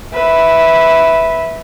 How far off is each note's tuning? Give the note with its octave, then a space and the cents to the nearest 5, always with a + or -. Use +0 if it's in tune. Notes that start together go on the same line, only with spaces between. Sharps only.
B4 +0 E5 -10